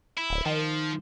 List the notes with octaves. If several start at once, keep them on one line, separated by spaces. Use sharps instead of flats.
E4
D1
D#3 F3